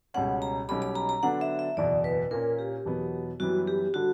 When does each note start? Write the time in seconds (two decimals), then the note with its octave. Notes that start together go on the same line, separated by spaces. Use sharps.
0.14 C#2 B2 G3 C#4 F#5
0.42 A#5
0.68 B1 B2 G3 C#4 G4 B5
0.82 B5
0.95 A#5
1.09 A#5
1.23 D3 F#3 B3 D4 F#5
1.41 E5
1.59 E5
1.77 F#1 E2 B2 D5
2.04 B4
2.31 A#2 A#3 C#4 A#4
2.59 G4
2.86 E2 B2 F#3 B3
3.40 F#2 E3 G3 B3 F#4
3.67 G4
3.94 D3 G3 F#4